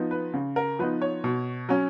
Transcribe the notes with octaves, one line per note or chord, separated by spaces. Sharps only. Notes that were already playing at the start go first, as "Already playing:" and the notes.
Already playing: F3 B3 D#4
B4
C#3
A#4
F3 B3 D#4 B4
C#5
B2
F#3 C#4